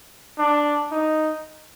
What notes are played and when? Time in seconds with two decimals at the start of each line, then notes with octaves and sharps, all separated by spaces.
0.38 D4
0.92 D#4